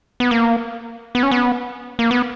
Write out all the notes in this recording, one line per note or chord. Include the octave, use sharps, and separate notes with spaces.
B3
A#3
B3
C#4
B3
A#3
B3